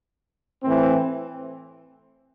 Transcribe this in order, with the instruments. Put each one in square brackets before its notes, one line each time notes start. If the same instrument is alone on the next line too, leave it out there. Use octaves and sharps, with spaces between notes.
[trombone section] A2 E3 C4